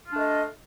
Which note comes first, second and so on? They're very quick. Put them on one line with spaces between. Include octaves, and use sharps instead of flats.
F4 D4 A3 D#5